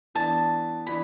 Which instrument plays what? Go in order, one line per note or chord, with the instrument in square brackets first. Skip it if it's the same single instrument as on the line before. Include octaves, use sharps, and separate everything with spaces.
[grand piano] E3 B3 D4 [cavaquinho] A5
[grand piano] E3 B3 D4 [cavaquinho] B5